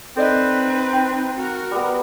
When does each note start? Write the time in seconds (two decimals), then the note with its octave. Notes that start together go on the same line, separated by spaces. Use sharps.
0.17 C4 D#4 A4 B4 D5 D#5
0.93 G5
1.36 F#4 A#4
1.71 G3 B3